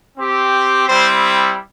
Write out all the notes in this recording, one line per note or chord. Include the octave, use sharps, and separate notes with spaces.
C4 G4
G3 C4 E4 C5